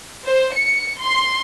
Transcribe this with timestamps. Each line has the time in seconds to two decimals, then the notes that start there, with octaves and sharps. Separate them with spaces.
0.24 C5
0.53 C#7
1.00 C6